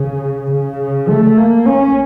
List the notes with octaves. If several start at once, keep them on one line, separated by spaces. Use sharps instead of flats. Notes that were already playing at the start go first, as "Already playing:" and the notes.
Already playing: C#3
C#3
A3
A#3
C#4